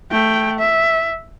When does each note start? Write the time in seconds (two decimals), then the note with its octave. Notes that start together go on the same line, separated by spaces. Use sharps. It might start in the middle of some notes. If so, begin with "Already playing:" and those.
0.11 A3 G5
0.59 E5